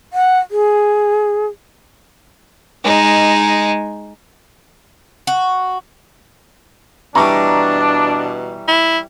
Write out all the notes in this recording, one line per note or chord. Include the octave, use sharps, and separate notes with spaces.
F#5
G#4
G#3 D#4
F#4
B2 E3 G3 D4 A#5 C#6
E4